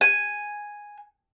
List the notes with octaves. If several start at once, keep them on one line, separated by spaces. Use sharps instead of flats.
G#5